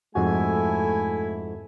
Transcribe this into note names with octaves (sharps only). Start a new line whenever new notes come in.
F2 G#2 A3 E4 F#4 G#5